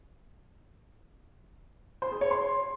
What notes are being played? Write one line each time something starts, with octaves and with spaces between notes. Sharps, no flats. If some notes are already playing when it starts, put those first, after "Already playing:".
C5
G#4
C#5
C6